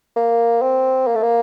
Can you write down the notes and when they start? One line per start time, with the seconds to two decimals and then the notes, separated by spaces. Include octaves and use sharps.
0.16 A#3
0.62 C4
1.07 A#3
1.16 A3
1.23 A#3